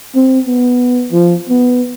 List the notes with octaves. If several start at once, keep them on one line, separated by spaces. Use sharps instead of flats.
C4
B3
F3
B3